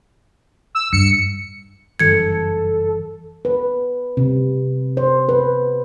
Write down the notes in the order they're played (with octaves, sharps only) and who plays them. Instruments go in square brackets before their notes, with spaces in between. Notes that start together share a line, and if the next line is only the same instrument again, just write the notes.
[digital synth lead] E6
[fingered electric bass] G2 [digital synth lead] C#7
[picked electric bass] F#1 G2 E3 [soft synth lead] A4 [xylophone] G#6 C#7
[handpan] B4
C3
C5
B4